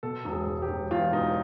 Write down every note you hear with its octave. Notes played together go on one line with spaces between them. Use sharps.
B2 A4
E1
G#4
E1
G4
E1
E2 F4
E1 D#4